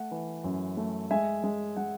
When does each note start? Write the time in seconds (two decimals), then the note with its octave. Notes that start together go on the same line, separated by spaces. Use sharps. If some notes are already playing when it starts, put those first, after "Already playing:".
Already playing: A3 F#5
0.11 E3
0.44 F#2
0.77 A3
1.11 G#3 E5 G#5
1.44 G#3
1.76 G#3 F#5